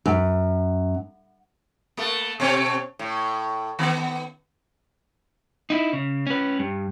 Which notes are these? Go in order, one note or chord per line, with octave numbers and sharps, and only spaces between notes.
F#2
A3 A#3
B2 C4 C#5
A2
D#3 B3
D#4 E4
C#3
C#4 B4
G2